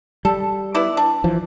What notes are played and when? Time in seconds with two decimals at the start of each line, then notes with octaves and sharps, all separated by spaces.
0.25 G3 A4
0.75 B3 E4 D5
0.97 D4
1.24 E3 F3